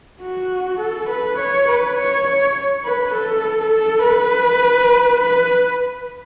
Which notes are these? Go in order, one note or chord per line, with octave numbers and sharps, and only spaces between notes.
F#4
A4
B4
C#5
B4
C#5
C#5
B4
A4
A4
B4
B4